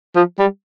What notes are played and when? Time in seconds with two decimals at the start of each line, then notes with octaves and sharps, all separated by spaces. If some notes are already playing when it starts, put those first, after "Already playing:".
0.15 F3
0.39 G3